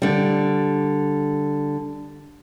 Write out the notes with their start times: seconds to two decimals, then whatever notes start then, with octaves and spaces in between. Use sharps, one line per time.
0.02 D3 G3